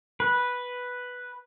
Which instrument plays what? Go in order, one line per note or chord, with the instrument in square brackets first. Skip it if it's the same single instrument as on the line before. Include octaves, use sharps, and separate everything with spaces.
[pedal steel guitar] B4